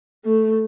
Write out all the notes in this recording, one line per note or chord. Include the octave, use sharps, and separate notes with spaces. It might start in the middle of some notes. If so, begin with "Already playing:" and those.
A3